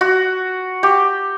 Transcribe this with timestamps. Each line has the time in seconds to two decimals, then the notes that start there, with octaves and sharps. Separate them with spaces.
0.01 F#4
0.83 G4